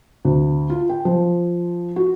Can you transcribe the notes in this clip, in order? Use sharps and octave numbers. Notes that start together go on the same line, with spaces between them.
D2
F4
G5
F3
F#4